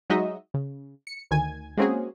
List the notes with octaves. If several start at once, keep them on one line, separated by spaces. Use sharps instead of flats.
F#3 G#3 D#4 F#4 D#5 E5
C#3
C#7
D2 D#3 G#5 G#6
G#3 A#3 C4 C#4 F#4 G#4